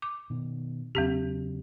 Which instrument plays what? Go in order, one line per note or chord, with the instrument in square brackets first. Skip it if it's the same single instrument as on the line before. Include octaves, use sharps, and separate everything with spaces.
[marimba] D6
[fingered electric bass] B2 D#3
[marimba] E2 C4 G4 [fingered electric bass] C#3 F#3